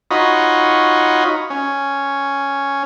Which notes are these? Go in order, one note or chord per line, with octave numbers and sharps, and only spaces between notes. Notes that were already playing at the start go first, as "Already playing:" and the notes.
D#4 F4 F#4 C#5 D#5 B5
C#4